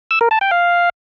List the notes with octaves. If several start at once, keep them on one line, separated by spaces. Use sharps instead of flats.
E6
A#4
A5
G5
F5